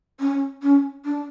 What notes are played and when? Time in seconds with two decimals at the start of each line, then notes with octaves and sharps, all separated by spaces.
0.20 C#4
0.63 C#4
1.05 D4